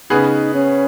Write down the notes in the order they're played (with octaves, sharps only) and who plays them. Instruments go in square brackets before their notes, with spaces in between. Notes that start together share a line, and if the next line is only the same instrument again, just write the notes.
[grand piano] C#3 B3 G#4 B4 [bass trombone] D#4
[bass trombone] C#4